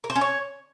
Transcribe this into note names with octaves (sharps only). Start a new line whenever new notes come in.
A#4
C5
C#4
C#5